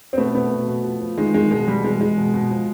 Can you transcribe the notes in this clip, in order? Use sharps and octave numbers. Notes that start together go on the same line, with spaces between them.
C4
B2 A3 B3
B2 A3 B3
B2
B2
F3
F3
D#3 G#3
D#3 G#3
B2 G#3
B2 G3
E3 G#3
E3 G#3
B2
B2
F3